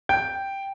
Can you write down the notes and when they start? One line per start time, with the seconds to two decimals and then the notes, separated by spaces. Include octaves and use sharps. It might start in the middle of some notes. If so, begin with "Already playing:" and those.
0.09 G5